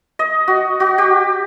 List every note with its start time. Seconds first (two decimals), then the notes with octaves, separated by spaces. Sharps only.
0.19 D#5
0.48 F#4
0.80 F#4
0.98 G4